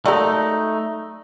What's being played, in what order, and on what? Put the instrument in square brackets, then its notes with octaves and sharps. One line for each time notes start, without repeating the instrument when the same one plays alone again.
[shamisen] F#3 G#3 A#4 [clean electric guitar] A3 D#4 [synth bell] D5